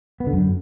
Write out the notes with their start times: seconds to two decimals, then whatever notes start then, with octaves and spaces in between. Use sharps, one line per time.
0.20 B3
0.27 D3
0.33 F#2